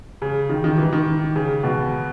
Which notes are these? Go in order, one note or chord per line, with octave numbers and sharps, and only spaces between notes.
C#3
D#3
D#3
E3
D#3
C#3
B2